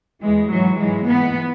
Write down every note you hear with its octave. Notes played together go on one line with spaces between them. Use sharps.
E2 E3 G#3
G#2 E3 F#3
G#2 E3 G#3
G#2 E3 B3